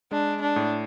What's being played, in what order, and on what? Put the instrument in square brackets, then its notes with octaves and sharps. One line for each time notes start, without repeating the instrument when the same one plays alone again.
[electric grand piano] G#3 [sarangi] D4
[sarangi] D4
[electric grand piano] A2